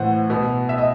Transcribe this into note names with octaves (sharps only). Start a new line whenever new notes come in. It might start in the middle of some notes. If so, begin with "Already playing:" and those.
Already playing: A2 E3 C5 F#5
B2
E5
D#5